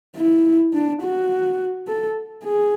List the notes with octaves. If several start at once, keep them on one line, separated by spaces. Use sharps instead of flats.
E4
D4
F#4
A4
G#4